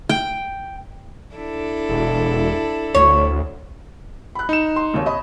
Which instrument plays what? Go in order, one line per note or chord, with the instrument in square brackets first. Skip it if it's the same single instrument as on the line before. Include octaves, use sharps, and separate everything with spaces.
[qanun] G5
[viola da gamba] D4 E4 A4
[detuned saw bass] E1
[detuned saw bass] D2 [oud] C#5
[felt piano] B5 F#6
[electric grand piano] D#4 E7
[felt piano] C6
G#1 D#2 C#5
C#5 D#5 B5